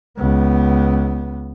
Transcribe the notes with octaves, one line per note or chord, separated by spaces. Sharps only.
C#2 B3